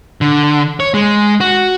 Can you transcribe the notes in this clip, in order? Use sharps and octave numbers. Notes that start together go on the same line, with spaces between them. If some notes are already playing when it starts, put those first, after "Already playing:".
D3
C#5
G#3
F#4